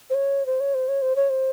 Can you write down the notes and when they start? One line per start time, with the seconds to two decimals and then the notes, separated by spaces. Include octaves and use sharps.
0.10 C5
0.15 C#5
0.46 C5
0.60 C#5
0.74 C5
0.88 C#5
1.02 C5
1.16 C#5
1.30 C5